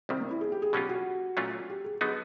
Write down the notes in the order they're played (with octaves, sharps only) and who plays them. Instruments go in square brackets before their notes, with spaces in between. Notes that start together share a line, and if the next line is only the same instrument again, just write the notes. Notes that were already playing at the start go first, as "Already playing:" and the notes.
[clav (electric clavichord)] C2 C3 D#3 G3 [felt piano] C4
[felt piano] A#3
E4
G#4
G4
G#4
[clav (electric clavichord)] B2 F#3 A#3 C#4 F4 [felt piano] G4
[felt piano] F#4
[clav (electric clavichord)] A#2 F#3 A3 C#4 F4
[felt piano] G4
G#4
[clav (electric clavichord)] D3 F#3 B3 D#4 [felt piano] G#4